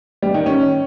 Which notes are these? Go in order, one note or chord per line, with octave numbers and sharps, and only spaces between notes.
G3
D#3
C#4